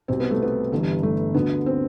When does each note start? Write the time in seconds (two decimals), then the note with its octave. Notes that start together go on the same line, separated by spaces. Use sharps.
0.08 C2 B2 C4
0.20 B3
0.31 A3
0.42 B3
0.72 G1 G2 E3
1.03 A3
1.34 D2 D3 B3
1.66 C4